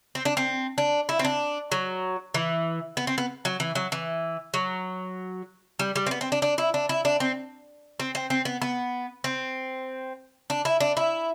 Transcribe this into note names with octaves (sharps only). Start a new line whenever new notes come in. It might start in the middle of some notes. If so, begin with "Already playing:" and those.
C4
D4
C4
D4
E4
C4
D4
F#3
E3
B3
C4
B3
F#3
E3
F#3
E3
F#3
G3
G3
C4
B3
C4
D4
D4
E4
D4
E4
D4
C4
C4
C4
C4
B3
B3
C4
D4
E4
D4
E4